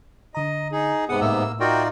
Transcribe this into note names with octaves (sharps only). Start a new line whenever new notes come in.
D3 D#5 A#5
D#4 G#4
G#2 C3 B3 G#4 B4 F#5 D#6
A2 A#3 E5 F5 E6
D#4 F4 F#4 A#4 D5 G5